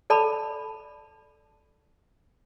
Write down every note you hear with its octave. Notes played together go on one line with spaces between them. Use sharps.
A4 D5 A5 B5